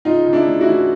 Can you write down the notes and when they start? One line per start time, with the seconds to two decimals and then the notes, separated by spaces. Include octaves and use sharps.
0.05 C#2 D#4 F4
0.26 C#2
0.33 D4 E4
0.47 C#3
0.61 E4 F#4
0.68 E3